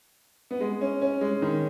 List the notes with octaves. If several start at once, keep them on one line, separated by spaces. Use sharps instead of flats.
B3
G#3
C#4
C#4
G#3
D#3